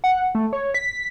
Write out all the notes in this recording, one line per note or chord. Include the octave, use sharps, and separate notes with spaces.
F#5
A3
C#5
B6